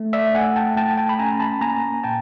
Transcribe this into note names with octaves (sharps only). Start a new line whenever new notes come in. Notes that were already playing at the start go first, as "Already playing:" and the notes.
Already playing: A3
D5 E5
A3 F#5 G#5
G5 A5
A3 G5 A5
G5 A5
B5
C#4 G#5 A#5
A5 B5
A#3 G#5 A#5
A#2 G5 A5